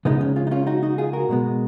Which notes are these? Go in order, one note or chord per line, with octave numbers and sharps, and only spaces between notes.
C#3 F3 G#3 B3 D#4
C#4
C#4 F4
D#4
C#4 F4
D#4 F#4
D#4 F#4
F4 G#4
F#4 A#4
B2 G#3 B3